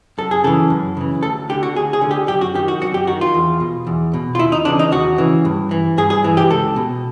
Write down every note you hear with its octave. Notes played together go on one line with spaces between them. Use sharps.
F#2 A4
G#4
C#3 E3 A4
F#2
C#3 E3
D2 A4
D3 G4
F#4
D2 G#4
G#4
D3
G4
F#2 G4
F#4
D#3 G4
F#4
F#2 F#4
G4
D#3 F#4
F4
E2
B2
E2
B2
F4
D#2 E4
D#4
C#3 E3 D4
D#4
D#2 F#4
C#3 E3
G2
E3
G2 G#4
G#4
E3
G4
C#2 A4
B2